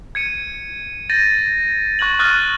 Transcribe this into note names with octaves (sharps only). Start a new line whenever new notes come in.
G#6 C#7 D#7
G6 A6 A#6 D#7
C#6 F#6 G#6 A#6 F#7
C#6 D#6 F6 F#6 A6 D#7